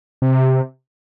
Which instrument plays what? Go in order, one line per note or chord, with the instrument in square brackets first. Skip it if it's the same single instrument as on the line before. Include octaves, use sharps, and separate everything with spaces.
[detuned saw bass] C3